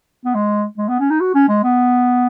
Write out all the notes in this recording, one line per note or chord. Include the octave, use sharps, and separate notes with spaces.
B3
G#3
G#3
B3
C#4
D#4
F#4
C#4
G#3
B3